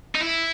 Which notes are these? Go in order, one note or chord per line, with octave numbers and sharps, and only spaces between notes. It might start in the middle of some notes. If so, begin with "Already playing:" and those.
D#4
E4